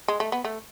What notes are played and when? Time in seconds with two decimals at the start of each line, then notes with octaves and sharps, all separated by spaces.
0.08 G#3
0.20 A3
0.32 B3
0.44 A3